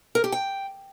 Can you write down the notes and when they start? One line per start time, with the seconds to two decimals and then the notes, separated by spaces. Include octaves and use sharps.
0.15 A#4
0.24 G4
0.32 G5